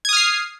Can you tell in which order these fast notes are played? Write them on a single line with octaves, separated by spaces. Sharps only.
G#6 D#6 F6 C7